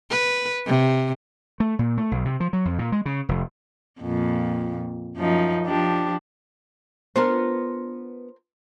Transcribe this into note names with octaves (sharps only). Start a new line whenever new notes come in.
B4
C3
A3
A#2
A3
B1
C3
F3
F#3
F2
A#2
G#3
C#3
F1
F2 A#2
F#2 F3 D#4
F3 D4 G4
B3 D4 F4 A#4 C5